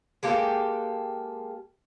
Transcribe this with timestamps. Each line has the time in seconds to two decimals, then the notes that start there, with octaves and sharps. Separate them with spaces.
0.23 G#3 A#3 G4 A4